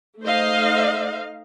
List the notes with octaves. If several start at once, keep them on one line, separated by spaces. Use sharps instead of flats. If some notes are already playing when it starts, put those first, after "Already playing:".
A3 D#4 C5 D#5 F5